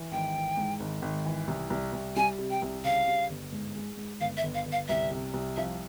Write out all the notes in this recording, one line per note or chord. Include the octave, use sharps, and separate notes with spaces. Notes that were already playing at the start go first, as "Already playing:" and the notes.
Already playing: E3
G#1 G5
E3
G#2
G#1
G#1
E3
C2
C2
C2
G3 G#5
C3
G5
C2
C#3 F5
G3
G1
G#2
G#3
G#2
G1 F5
E5
G1
F5
G1
F5
C2 E5
C3
C2
F3 E5